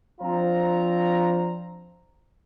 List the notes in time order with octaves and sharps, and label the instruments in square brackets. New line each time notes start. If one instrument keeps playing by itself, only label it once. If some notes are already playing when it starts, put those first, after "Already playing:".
[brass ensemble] F3 C4 D4 F4 C5 A#5